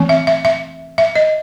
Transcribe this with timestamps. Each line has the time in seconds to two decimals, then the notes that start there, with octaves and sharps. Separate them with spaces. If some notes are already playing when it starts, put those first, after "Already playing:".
Already playing: E3 A3 C4
0.09 E5
0.27 E5
0.45 E5
0.98 E5
1.16 D#5